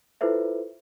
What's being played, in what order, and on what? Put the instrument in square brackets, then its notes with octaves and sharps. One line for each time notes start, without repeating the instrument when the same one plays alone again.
[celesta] E4 F4 A4 B4 C5 E5